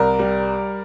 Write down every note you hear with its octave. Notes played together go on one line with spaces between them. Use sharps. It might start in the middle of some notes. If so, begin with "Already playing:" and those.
Already playing: C2 A#4 D5
G3